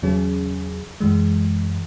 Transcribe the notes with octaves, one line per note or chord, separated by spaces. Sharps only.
E2 C#3 F#3 C#4 G#4
F#2 E3 G#3